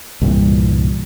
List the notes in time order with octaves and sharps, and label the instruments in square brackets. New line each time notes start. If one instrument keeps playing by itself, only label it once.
[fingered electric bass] C2 G2 A#2 E3